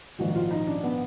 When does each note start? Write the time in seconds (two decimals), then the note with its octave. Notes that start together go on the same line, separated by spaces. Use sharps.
0.18 A#1 G#2 D#3 F#4
0.35 F4
0.51 D#4
0.67 D4
0.83 B3